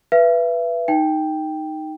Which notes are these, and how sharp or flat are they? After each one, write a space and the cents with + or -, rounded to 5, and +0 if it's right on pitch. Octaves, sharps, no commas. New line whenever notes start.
B4 -5 E5 +35
D#4 +0 G5 +0